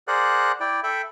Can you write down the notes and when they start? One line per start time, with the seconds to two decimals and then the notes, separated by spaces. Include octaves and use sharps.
0.08 G#4 A#4 C5 D5 F#5 F#6
0.60 E4 D5 G5
0.83 A4 E5 G5 B5